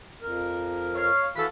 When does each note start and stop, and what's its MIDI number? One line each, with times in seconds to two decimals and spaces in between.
0.22 1.10 41
0.22 1.10 70
0.95 1.28 73
0.95 1.28 77
1.36 1.44 52
1.36 1.47 66
1.36 1.44 69
1.36 1.47 77
1.36 1.44 83